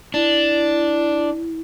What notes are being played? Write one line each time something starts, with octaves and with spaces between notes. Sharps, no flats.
D4 E4